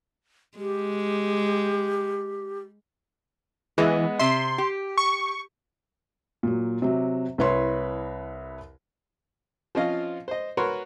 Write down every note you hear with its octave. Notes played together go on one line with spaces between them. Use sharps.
G#3 G4
E3 G#3 B3
C3 E5 C6
G4
C#6
A#2 F#3
C3 F#3
C2 E4 B4 C#5 C6
F3 C4 C#4 F4 D#5 F5
C5 D#5
F#4 A#4 B4 C#5 C6